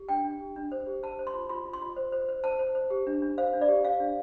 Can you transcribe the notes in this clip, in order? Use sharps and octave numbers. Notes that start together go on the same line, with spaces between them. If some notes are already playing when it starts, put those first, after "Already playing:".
Already playing: G4
D4 G5
D4
G4
D4
C5
G4
C5 A5
C5
C6
F4
F4 C6
F4
C6
F4
C5
C5
C5
C5 A5
C5
C5
G4
D4
D4
C5 F5
D4
D5
G4
C5 F5
D4